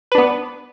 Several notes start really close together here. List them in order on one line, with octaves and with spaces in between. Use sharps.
B4 D4 B3